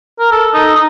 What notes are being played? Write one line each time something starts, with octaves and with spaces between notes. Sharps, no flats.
A#4
A4
D#4
D#4